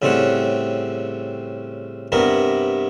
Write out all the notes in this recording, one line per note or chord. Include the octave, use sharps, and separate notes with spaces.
A2 C#3 G3 C4 C#4 F#5
G2 C3 B3 G4 A#4